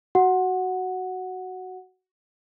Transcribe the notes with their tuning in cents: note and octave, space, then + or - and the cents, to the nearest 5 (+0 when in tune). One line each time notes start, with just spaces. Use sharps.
F#4 +10 F#5 -5